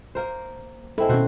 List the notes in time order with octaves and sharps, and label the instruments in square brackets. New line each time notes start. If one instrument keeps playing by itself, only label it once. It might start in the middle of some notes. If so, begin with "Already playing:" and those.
[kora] A#3 A#4 C5
[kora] G#3 C4 E4 [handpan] A4
[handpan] B2 D#3 C#4 [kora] F#4 C5